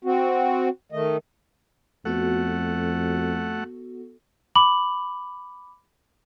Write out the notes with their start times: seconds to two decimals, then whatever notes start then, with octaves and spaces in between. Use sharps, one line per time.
0.05 C4 F#4
0.92 D#3 A3 D#5
2.05 F2 A3 B3 F#4 A4 F#5
4.55 B5 D6 F#7